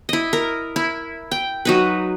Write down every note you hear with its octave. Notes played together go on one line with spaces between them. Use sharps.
E4 D#5
A#4
E4
G5
F#3 D#4 B4